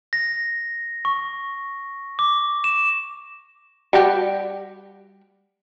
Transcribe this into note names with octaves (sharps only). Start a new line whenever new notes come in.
A#6
C#6
D6
E7
G3 F#4 G4